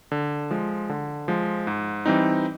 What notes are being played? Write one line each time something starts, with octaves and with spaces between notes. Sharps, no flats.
D3
F3 G#3
D3
F3 G#3
G#2
E3 G3 C4 D#4